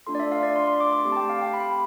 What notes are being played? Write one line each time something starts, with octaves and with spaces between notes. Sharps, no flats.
A3 D4 F4 A4 C6
D5
E5
F5
D5
C6
C6
D6
D6
A3 C4 G4 D6
A5
G5
F5
G5
B5